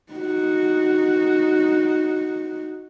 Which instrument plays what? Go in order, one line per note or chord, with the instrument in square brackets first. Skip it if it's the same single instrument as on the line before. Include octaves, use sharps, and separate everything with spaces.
[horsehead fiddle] D#4 F#4